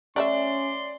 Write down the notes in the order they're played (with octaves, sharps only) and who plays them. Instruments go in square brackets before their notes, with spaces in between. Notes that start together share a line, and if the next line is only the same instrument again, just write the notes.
[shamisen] A3 A#4 E5 [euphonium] C#4 [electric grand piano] D5 [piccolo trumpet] C6